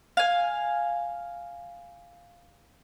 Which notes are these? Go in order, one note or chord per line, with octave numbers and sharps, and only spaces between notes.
F5 G#5